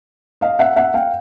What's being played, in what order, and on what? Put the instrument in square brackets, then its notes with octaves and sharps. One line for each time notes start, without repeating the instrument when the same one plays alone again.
[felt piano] D#5 F5
E5 F#5
E5 F#5
F5 G5